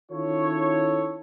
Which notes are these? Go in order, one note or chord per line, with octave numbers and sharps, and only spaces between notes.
D#3 C#4 E4 F4 A4 C#5